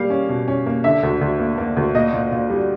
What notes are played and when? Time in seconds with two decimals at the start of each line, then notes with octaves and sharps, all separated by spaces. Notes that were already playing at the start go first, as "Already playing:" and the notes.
Already playing: G3 A#3 F5
0.10 C#4
0.29 B2
0.48 C#4
0.66 A#3
0.84 D3 E5
1.03 D2
1.21 D2
1.40 A#3
1.58 A#3
1.77 D2
1.95 A#2 D#5
2.14 A#2
2.32 A#2
2.50 G3